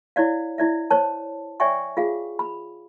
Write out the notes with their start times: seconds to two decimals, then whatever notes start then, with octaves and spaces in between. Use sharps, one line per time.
0.16 E4 C#5 D5 F5
0.58 E4 D5 E5
0.90 C5 C#5 A5
1.60 C#5 D5 E5 G5 G#5 C#6
1.97 F4 G#4 F5
2.39 B5